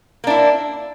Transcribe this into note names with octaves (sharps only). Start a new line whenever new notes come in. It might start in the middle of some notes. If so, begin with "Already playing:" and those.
A#3 D4 E4